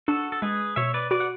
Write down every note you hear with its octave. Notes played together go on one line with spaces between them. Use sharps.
D4 F#4 A4
A4
G#3 G#4 B4
B2 C#5 E5
B4 D5
F#4 B4 D5
F#5